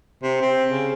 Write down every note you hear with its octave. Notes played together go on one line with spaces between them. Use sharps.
C3
C4
C#3